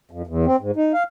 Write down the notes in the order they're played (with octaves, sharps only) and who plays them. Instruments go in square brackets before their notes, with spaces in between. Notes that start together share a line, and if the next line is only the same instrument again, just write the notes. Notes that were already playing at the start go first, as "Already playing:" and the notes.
[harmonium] F2
E2
C4
G#2
D#4
F5